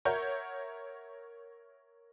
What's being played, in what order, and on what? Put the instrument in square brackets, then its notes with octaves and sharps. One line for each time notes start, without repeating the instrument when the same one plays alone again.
[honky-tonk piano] A#4 C#5 E5 F#5 G6